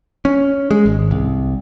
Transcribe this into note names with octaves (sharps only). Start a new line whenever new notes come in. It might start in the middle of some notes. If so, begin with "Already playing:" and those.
C#4
G#3
G#1
C2